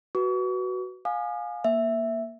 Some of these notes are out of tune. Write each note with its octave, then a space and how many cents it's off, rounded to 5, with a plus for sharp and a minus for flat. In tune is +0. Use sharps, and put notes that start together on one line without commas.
F#4 +10 B4 +0 C#6 +40
F5 +25 G#5 +0 D#6 -40
A#3 +10 E5 +0